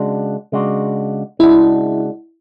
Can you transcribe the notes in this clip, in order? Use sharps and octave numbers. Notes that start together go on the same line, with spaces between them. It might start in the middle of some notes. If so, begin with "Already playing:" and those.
Already playing: C#3 G#3 D4 F#4
C#3 G#3 D4 F#4
C#3 G#3 D4 E4 F#4